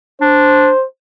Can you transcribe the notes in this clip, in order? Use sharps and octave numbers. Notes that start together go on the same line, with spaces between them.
D4 C5